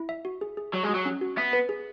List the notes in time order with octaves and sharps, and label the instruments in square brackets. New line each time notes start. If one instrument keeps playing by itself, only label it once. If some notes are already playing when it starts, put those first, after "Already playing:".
Already playing: [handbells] E4
E5
F#4
G#4
G#4
[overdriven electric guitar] F#3 [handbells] F#4
[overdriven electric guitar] G#3
[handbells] F#4
[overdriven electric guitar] F#3
[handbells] C#4
F#4
[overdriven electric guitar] B3 [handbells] E5
[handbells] B4
G#4